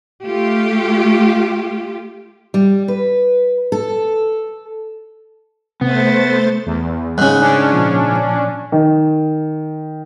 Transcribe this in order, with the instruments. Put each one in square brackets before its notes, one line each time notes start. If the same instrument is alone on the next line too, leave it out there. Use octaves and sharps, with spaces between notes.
[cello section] A3 F4 G4
[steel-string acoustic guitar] G3
B4
A4
[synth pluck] C3 [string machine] A3 C5 A6 [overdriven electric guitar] B3
[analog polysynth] E2
[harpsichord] G#2 C#3 [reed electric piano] F#6
[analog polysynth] C#4 D4
[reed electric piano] A#2 F3
[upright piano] D#3